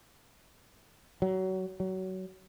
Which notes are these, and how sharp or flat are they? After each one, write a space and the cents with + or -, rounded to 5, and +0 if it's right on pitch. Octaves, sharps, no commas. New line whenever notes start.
F#3 +25
F#3 +20